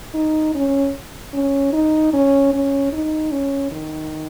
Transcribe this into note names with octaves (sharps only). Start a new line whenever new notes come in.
D#4
C#4
C#4
D#4
C#4
C#4
D#4
C#4
D#3